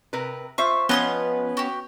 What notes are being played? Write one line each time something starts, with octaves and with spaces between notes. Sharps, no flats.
C3 A#4 B4
F4 C5 E5 C#6
F3 B3 C#4 B4 D#5 C6 D#6
F#4 G4